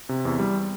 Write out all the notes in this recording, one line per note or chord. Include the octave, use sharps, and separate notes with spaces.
C3
E2
G3